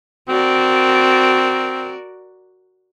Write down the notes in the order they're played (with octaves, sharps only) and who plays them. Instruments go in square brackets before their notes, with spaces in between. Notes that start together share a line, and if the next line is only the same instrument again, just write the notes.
[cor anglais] C4 [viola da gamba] F#4 A#4 D5